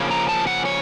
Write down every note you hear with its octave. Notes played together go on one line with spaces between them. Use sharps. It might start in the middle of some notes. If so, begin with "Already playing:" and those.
Already playing: C#3 F3 A#3 C#4
A#5
A5
F#5
C#5